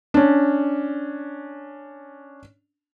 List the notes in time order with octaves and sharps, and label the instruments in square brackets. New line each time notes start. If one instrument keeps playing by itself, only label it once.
[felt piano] C#4 D4